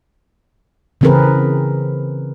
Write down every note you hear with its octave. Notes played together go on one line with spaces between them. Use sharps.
C#3 E3 C4 G#4 A#4 B4